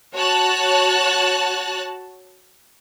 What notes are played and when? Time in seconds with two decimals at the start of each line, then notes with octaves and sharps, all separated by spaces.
0.14 F#4 C#5 A5 F#6